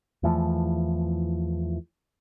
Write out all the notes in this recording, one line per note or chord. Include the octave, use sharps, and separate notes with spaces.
E2 E3 F3 A3